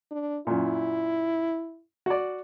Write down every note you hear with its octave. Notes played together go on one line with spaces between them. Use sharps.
D4
F#2 A#2 E4
F#4 D5